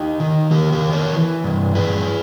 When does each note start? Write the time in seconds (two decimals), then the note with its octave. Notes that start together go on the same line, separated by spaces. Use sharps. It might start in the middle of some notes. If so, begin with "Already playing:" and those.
Already playing: D#4 G4
0.20 D#3
0.51 D#3 G4 A#4
0.73 G4 A#4
0.82 D#3
0.93 A#4 C#5
1.13 E3
1.44 G2
1.75 G2 G#4 B4